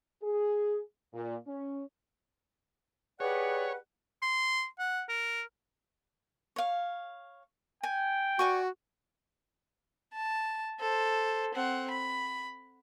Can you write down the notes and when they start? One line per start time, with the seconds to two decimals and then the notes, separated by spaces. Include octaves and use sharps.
0.23 G#4
1.14 A#2
1.47 C#4
3.20 G4 G#4 B4 C#5 D5 F#5
4.22 C6
4.79 F#5
5.09 A#4
6.56 C#5 F5
7.83 G5 G#5
8.39 F#4 D5 G#5 C#6
10.14 A5
10.80 A4 C5
11.54 C4 F#5
11.91 B5